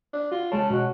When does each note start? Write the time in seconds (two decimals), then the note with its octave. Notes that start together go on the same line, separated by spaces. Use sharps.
0.13 D4
0.32 F4 F#4
0.52 C2 C#3 G#3 C#5 A5
0.70 B2 F#4